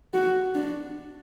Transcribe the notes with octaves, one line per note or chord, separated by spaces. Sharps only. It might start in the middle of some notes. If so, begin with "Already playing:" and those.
F#4
D4